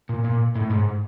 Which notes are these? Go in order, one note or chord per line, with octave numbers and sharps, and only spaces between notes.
A#2
A#2
A2
G#2